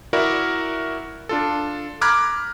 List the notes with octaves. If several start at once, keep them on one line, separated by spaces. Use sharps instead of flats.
E4 F#4 A#4 D5 E5
D4 F4 A4
A#5 B5 D6 F6 F#6 G#6